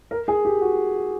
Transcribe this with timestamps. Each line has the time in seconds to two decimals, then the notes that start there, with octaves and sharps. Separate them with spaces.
0.11 A#4
0.28 G#4
0.45 G4
0.62 F#4